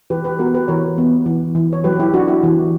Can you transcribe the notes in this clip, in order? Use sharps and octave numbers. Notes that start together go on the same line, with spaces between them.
E3 G4 B4
G4 B4
B3 F#4 A#4
G4 B4
E3 A#4 C#5
B3
E3
E3
C#5
F#3 G4 B4
E4 G4
F#3 D4 F#4
E4 G4
E3